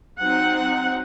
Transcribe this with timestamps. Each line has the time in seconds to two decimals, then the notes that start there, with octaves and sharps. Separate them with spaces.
0.18 F#3 C4 D#4 F#5